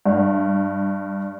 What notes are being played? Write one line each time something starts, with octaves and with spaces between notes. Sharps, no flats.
G2